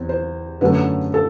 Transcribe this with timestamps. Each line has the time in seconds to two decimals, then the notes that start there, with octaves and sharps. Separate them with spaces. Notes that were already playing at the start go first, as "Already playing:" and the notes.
Already playing: E2 C4
0.09 C5
0.61 F#2 D3 F#3 A3 B4
1.14 A4